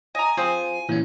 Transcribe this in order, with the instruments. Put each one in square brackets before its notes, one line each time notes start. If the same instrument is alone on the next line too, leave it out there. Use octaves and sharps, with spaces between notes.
[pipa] D#5 A#5 [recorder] G#5
[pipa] C4 G#4 [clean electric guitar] F4 C5
[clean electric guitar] A#2 C#4 [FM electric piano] E3